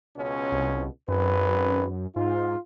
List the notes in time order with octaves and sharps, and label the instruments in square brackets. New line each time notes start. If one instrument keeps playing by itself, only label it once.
[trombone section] C#2 B2 C#4
[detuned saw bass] C2
[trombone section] G#1 B4 [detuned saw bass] F#2
[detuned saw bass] G#2 [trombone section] F4